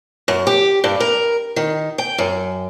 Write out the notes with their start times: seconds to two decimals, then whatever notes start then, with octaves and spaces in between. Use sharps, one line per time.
0.28 F#2
0.47 G4
0.84 G2
1.00 A#4
1.56 D#3
1.98 G5
2.18 F#2